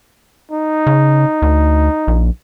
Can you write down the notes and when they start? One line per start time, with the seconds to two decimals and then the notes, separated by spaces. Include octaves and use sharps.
0.52 D#4
0.87 C#3
1.42 D2
2.08 A#1